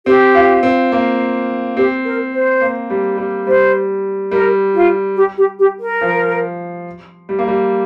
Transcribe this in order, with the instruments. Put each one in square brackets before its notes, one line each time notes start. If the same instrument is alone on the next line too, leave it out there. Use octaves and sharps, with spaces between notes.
[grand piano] C4 [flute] G4
[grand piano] F4
C4
A#3
[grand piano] C4 [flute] G4
[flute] A#4
C5
[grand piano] A#3
G3
G3
[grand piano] G3 [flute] C5
[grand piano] G3 [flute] A#4
[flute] F4
G4
G4
G4
A#4
[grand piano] F3
G3
A#3
G3